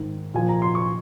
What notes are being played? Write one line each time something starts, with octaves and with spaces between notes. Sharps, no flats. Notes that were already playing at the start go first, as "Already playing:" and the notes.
Already playing: G#2 D#3
A#2 F3 G#5
A#5
C6
C#6